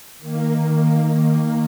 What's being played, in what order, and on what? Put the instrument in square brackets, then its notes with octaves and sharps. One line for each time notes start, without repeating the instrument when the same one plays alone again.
[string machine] D#3 A#3